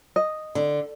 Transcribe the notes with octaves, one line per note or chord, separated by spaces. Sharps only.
D#5
D3